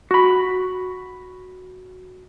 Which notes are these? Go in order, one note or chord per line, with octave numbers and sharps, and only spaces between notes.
F#4 B5